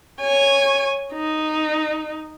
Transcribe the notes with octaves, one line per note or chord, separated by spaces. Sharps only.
C#5 G#5
D#4